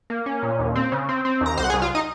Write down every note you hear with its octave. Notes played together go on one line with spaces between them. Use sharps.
A#3
C#4
A#2
D#2
C4
C#3
C4
C4
D#2 A#5
C2 C5 C6
F#5
G#4 G#5
C2
F4 F5
D#4 D#5